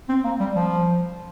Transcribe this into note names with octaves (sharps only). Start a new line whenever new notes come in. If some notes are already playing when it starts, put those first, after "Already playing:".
C4
A#3
G3
F3